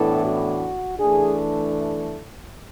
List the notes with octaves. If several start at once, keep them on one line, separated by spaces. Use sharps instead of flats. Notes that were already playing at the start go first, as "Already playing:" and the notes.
Already playing: A2 E3 B3 D4 A4
F#4
E3 A3 D4 G#4